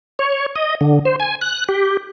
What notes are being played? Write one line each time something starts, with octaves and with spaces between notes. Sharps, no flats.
C#5
D#5
D3
C5
G#5
F#6
G4